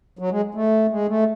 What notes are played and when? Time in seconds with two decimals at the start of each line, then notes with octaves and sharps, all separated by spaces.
0.19 F#3
0.31 G#3
0.54 A3
0.91 G#3
1.08 A3